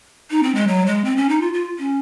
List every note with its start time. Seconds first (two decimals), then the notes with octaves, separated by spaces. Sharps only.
0.31 D#4
0.43 C4
0.55 G#3
0.68 F#3
0.86 G#3
1.05 C4
1.17 C#4
1.29 D#4
1.41 F4
1.53 F4
1.79 C#4